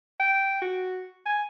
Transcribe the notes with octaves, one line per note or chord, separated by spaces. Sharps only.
G5
F#4
G#5